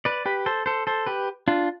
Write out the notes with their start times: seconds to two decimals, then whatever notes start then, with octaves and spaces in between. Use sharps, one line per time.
0.05 B4 D5
0.26 G4 B4
0.46 A4 C5
0.66 A4 C5
0.87 A4 C5
1.06 G4 B4
1.48 D4 F4